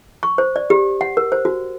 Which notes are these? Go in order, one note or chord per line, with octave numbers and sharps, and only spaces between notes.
C#6
C5
D5
G4
F#5
A#4
C5
F#4